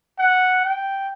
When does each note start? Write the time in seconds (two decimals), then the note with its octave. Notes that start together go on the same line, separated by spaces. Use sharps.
0.19 F#5
0.65 G5